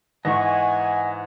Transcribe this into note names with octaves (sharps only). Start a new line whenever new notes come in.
G#2 E3 D#5 F#5 G#5 C#6